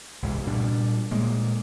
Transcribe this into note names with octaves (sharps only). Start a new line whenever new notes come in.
C2 G#2 E3
A#2 G3 D4
A#2 G#3 A#3